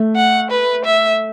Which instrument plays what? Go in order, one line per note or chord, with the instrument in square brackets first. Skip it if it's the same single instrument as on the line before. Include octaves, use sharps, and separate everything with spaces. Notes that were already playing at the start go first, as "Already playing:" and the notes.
Already playing: [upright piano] A3
[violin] F#5
B4
E5